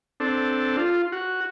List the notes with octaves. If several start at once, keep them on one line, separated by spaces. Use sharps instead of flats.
C4 D4 A4
F4
F#4